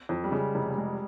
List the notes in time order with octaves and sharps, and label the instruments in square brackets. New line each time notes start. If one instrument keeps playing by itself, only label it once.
[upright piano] F2
[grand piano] G3
[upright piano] C#3 [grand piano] G#3
[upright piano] F1
G#3